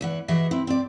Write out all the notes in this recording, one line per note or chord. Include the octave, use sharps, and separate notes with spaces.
E2 E3 F#5
E3 F#4 G#4 D#5 E5
C4 E4
C4 D5